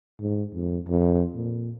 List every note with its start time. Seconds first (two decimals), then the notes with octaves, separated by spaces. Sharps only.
0.20 G#2
0.54 F2
0.88 F2
1.35 A#2